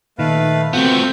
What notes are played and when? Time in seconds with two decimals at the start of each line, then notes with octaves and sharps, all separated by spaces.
0.19 A#2 D#3 A3 B4 F5
0.73 A3 B3 C4 F4 F#4 G6